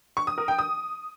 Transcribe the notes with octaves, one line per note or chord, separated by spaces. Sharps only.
C#6
D#6
A#4
G5
D#6